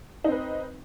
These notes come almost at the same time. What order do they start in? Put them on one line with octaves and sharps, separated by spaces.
D#4 C4 B4